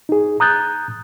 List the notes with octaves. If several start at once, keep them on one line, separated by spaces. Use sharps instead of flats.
D#4 G#4
A#5 D#6 F#6 G6 A6